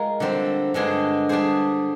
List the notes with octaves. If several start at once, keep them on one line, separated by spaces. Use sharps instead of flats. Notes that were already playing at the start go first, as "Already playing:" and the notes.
Already playing: G#3 F4 A#4
D3 G3 C4
G2 D3 G#3 D4 G#4
G3 D4 G#4 C5